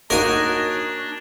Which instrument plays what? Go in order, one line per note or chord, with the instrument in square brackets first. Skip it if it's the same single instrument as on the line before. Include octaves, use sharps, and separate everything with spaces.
[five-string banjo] A#3 D#4 F#4 [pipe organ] D4 [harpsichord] A#4 G#5 [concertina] C#5 D#5